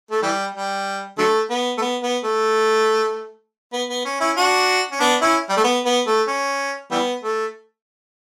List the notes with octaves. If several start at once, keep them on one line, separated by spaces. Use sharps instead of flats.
A3
E3 G3
G3
D3 F#3 A3
B3
A3
B3
B3
A3
B3
B3
C#4
C#4 E4
D4 F#4
C#4
B3 D4
C#4 E4
G3
A3
B3
B3
A3
C#4
E3 G3 B3
A3